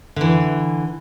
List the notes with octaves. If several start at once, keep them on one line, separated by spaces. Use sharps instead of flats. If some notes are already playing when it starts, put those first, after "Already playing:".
D3 E3